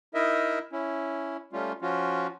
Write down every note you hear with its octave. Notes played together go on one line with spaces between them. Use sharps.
D#4 E4 A#4 D#5 E5
C#4 E4
G3 A3 C#4 F4
F3 C#4 F4 F#4